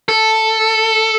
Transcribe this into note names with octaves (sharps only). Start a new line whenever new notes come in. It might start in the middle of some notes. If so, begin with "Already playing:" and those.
A4